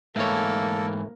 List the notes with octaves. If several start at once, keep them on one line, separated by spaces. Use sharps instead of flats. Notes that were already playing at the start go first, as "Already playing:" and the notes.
G#2 E3 A3 A#3 A4 C#5